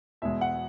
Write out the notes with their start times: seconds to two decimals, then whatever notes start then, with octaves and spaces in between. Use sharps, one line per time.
0.22 E2 B2 G#3 E5
0.41 F#5